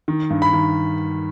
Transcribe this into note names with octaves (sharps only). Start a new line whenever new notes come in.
D#3
G2
B5
D#3